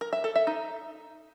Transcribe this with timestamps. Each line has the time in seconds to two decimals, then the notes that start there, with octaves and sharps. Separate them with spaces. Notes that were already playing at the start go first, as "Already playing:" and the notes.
0.01 A#4
0.13 E5
0.24 A4
0.36 E5
0.47 D#4